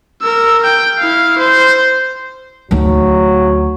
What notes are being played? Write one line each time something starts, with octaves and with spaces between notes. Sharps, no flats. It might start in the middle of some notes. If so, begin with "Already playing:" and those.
A#4 E6
G5
E4 F5
C5
D2 F#3 D#4